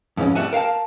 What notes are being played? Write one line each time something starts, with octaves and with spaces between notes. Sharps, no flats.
F2 G#2 E3 C#4
G3 A3 E5 F#5 G#5
A#4 F5 G5 A5